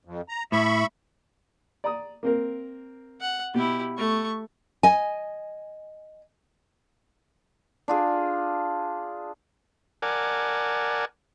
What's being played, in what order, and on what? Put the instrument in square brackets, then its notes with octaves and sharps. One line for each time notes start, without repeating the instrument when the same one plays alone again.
[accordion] F2
A#5
[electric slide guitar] A2 [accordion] E5 B5 C#6
[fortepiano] D5 A#5 D#6
A#3 C4 A#4
[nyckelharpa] F#5
[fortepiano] B2 [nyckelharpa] E4 G4
[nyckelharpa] A3 C#6
[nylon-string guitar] D#5 G#5
[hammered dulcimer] D4 F4 G#4
[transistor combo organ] A#4 D5 F#5 G#5 A5